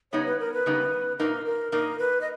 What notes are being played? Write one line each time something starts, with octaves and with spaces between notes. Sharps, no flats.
C#3 G3 B3 D#4 C#5
B4
A#4
B4
C#3 G3 B3 D#4
A#2 A#3 D#4 A#4
A#4
A#2 A#3 D#4 A#4
B4
D#5